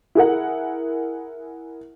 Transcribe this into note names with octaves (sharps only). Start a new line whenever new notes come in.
E4 G#4 A#4 F#5